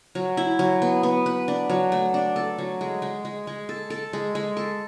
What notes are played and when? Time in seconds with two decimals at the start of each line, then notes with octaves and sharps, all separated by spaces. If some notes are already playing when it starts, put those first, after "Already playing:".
0.15 F#3
0.37 E4
0.59 F#3
0.82 B3
1.03 B3
1.26 B4
1.48 D4
1.70 F#3
1.92 A3
2.14 D4
2.36 A4
2.58 F#3
2.81 G#3
3.02 G#3
3.25 G#3
3.47 G#3
3.69 A4
3.90 A4
4.13 G#3
4.35 G#3
4.57 A4